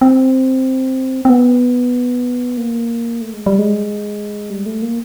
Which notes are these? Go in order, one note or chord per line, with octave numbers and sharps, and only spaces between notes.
C4
C4
B3
A#3
A3
G#3
G3
G#3
G3
A3
A#3